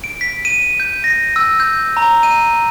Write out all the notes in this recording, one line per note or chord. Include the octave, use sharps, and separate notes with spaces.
D7
B6
D#7
G6
A#6
E6
G6
A#5
D#7